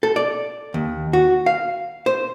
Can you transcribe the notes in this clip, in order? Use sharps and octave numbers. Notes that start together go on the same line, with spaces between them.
A4
D5
D#2
F#4
F5
C5